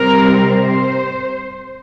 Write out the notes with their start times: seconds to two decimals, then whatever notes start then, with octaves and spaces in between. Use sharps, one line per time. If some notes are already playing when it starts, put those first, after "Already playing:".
Already playing: C3 G3 C4 A#4
0.48 C5